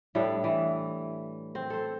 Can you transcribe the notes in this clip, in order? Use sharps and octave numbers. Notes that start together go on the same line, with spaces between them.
A2 G3 D4 A4
E3
C4
A4 C5